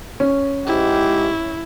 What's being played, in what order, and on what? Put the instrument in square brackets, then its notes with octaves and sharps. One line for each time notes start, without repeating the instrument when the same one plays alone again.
[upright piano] C#4
[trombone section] G#2 G4 [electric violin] E4